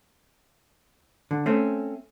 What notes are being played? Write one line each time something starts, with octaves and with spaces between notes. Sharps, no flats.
D3
A3 C4 C#4